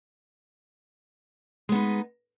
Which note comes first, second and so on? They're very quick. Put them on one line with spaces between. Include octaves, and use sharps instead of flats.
G#3 B3 D#4